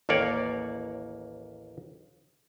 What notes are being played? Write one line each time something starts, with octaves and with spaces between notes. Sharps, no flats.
A1 D#2 A#3 C#5 D5